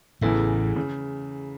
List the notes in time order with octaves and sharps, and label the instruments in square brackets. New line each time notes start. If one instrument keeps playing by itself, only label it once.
[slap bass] A1 A2 [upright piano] E2 C#3 E3 A3 E4
[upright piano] C#3